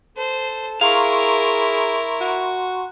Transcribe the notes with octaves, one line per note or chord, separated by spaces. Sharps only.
A4 C5
E4 G#4 A#4 F5 A#5 C6 C#6
F#4